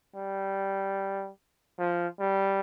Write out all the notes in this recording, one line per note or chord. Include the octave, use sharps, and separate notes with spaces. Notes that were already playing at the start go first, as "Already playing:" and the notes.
G3
F3
G3